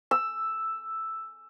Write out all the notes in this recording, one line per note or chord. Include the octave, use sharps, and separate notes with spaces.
E6